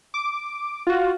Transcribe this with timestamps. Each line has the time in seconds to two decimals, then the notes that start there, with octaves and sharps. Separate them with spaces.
0.14 D6
0.87 F4 F#4